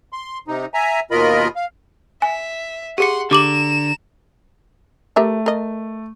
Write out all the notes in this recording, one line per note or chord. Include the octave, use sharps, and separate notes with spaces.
C6
C3 D#4
E5 G#5 A#5
D#2 B2 F4 A#4 D#5 B5
F5
E5 G#5
G4 G#4 F#5 C6 C#7
D3 G4 A#5 D6 E7 F#7
A3 G4 A#4 E5
A#4 D#5